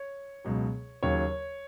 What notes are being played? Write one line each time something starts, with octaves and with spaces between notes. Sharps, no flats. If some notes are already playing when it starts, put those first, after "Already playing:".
Already playing: C#5
C#2 B2 F#3
D#2 C#3 F#3 C#5